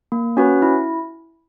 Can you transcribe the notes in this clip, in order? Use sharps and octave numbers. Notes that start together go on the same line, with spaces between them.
A#3
C#4 F#4 B4
E4